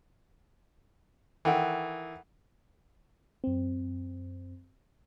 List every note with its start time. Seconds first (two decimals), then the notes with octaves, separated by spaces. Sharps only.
1.45 D#3 E3 A4 F#5 G5
3.44 F#2 C4